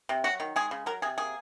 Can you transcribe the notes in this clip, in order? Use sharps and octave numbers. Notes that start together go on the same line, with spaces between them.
C3
F#3 F#4
D#3
G#3 G#4
C#3
F#3 A#4
C3 G#4
A#3 G#4